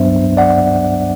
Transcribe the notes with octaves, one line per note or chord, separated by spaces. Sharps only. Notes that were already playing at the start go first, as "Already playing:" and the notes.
Already playing: G2 F#3 B3 D4 C5 E5
D5 F#5